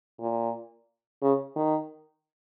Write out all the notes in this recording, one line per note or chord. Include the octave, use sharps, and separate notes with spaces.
A#2
C#3
D#3